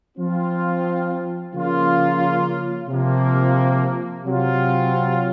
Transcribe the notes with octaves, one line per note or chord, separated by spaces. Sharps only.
F3 C4 F4
C#3 F3 A#3 C#4 F4
C3 F3 A#3
C3 F#3 C4 F4